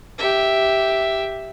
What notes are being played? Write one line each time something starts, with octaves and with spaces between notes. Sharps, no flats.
G4 E5